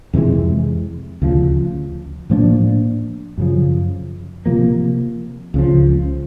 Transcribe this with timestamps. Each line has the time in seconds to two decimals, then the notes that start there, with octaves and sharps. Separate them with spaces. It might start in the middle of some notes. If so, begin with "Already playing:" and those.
0.14 F2 C3 E3 G#3
1.22 D2 C#3 F3
2.30 A2 F3 A#3 D4
3.38 F#2 C#3 F3
4.46 C3 F3 A#3
5.54 C#2 C#3 F3